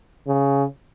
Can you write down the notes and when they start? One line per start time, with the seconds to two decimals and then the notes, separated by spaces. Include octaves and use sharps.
0.27 C#3